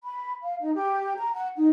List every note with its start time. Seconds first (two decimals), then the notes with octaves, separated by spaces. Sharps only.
0.03 B5
0.43 F5
0.60 D#4
0.74 G4
1.17 A#5
1.34 F#5
1.55 D#4